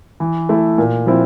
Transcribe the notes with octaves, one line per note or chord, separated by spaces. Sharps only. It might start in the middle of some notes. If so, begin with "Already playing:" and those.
E3
A3 E4
A#2
F3 C4 E4